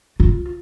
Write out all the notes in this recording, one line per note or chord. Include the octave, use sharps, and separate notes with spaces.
F4